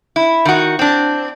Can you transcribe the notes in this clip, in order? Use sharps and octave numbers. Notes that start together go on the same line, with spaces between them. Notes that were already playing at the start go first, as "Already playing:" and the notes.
E4
D#3 F#4
C4 D4